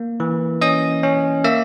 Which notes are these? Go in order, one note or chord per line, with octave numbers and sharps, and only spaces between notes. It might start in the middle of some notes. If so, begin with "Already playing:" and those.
Already playing: A#3
E3
C#4 D#5 D#6
C#4
A#3 E5 E6